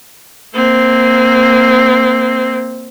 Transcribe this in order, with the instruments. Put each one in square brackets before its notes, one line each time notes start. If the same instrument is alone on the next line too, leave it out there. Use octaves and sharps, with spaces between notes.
[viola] A#3 C4